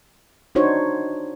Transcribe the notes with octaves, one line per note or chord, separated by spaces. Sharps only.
D4 D#4 F#4 C5 C#5